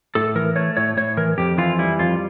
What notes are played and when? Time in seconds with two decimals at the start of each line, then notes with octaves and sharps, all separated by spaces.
0.15 A2 A4
0.35 E3 A#4
0.56 A3 C#5
0.77 A2 C#5
0.97 A2 C#5
1.17 E3 A#4
1.38 F2 G4
1.58 E3 F4
1.78 G3 E4
1.99 F2 F4